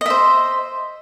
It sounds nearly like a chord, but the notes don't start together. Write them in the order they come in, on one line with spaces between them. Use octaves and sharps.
D#5 E5 C5